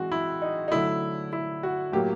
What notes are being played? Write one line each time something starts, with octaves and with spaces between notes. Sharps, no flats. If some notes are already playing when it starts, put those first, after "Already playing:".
Already playing: E3 G#3 C4 F#4
E4
D#4
D#4
D3 F#3 A3 E4
E4
F#4
A2 F#3 A#3 G4